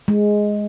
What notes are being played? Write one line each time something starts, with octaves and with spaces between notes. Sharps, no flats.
G#3